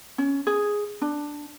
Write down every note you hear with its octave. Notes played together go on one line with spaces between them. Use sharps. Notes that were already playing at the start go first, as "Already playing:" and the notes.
C#4
G#4
D4